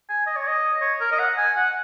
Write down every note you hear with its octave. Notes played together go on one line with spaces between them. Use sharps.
G#5
D#5
C#5
D#5
C#5
A#4
D#5
F#5
G#5
F#5